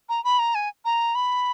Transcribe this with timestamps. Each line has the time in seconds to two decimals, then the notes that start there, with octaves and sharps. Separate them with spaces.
0.09 A#5
0.24 B5
0.39 A#5
0.55 G#5
0.85 A#5
1.15 B5